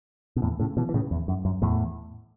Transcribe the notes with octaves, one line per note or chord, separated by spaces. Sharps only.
B2
E2 A2
A2 C#3
B2 E3
E3
A2 C#3
E2
F#2
F#2
E2 A2